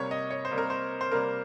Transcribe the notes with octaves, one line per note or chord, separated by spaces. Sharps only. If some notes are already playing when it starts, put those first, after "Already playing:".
Already playing: C3 G3 A#3 C#5
D#5
C#5
C5
C3 G3 A#3
A#4
C5
C5
C3 G3 A#3 A#4